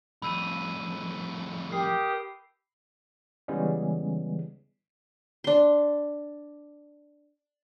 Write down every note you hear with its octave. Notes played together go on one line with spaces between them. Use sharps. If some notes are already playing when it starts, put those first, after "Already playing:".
F2 A2 B5 E6 D#7
G4 A#4 D#6 C7
C#3 E3 G3 G#3 B3 C#4
D4 C6